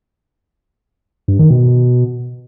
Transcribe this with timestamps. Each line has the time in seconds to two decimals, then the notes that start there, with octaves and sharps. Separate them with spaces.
1.28 G2
1.39 D#3
1.50 B2